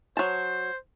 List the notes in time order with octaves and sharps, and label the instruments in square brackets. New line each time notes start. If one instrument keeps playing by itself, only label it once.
[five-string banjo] F#3 A5 [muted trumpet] C5